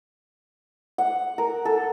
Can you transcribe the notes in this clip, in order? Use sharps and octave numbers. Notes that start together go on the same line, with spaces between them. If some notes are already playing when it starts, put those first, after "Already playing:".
F#5
A#4
A4